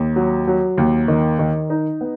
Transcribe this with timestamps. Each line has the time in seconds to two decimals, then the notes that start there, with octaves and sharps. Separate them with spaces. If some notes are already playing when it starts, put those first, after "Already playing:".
Already playing: D#2
0.16 F#3
0.47 F#3
0.78 D#2
1.08 D#3
1.39 D#3
1.70 D#4
2.01 B3